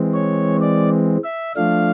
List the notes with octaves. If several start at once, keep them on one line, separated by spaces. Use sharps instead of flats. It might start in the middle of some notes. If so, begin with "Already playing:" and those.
Already playing: E3 G#3 C4
C#5
D5
E5
F3 A3 D4 F5